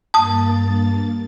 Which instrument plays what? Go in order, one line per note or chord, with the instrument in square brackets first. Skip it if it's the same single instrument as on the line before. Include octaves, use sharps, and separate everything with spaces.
[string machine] G2 A#3 A6 [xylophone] A5 D#6